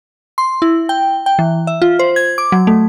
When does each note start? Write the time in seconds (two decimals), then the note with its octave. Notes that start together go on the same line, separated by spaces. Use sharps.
0.38 C6
0.62 E4
0.89 G5
1.26 G5
1.39 E3
1.67 E5
1.82 F4
1.99 C5
2.16 G#6
2.38 D6
2.52 F#3
2.67 A3